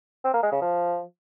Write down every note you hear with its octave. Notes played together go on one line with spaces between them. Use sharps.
C4
A#3
G#3
C#3
F3